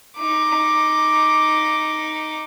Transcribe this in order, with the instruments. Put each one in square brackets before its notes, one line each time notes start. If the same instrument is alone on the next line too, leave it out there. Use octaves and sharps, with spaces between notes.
[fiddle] D#4 D6